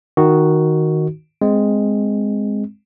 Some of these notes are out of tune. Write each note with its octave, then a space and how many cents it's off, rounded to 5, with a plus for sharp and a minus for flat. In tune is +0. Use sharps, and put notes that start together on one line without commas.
D#3 +0 D#4 +0 F#4 +0
G#3 +0 C4 +0